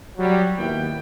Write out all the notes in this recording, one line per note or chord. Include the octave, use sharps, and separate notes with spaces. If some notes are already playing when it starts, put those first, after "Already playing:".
F#3 G3
D#2 B3 E4 G5